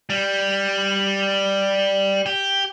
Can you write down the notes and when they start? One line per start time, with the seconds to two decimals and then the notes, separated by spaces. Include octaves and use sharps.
0.10 G3
2.26 G4